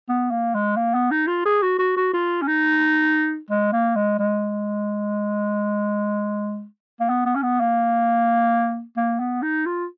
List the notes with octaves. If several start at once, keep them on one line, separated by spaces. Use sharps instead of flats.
B3
A#3
G#3
A#3
B3
D#4
F4
G#4
F#4
F#4
F#4
F4
C#4
D#4
G#3
A#3
G#3
G#3
A#3
B3
B3
C#4
B3
A#3
A#3
B3
D#4
F4